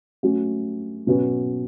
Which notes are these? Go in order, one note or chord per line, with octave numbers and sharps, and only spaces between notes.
F#3 A3 C#4 F#4
B2 F#3 C#4 F#4 B4